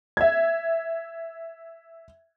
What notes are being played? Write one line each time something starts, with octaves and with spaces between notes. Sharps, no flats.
E5 G#6